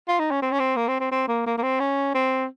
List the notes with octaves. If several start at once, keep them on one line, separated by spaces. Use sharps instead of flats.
F4
D#4
C#4
C4
C#4
C4
A#3
C4
C4
C4
A#3
A#3
A#3
C4
C#4
C4